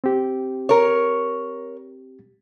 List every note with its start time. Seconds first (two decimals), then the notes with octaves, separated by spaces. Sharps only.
0.04 C4 G4
0.69 A#4 C#5